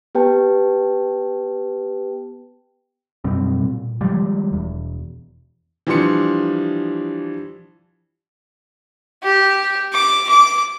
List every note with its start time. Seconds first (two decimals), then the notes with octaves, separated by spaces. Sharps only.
0.15 B3 G4 B4 G5 A5
3.24 F#2 B2 G3 C4
3.63 A#2
4.01 D#3 F3 G3 G#3
4.52 E1 E2
5.87 E3 F3 G3 D4 C6 C#7
9.23 G4
9.92 D6
10.29 D6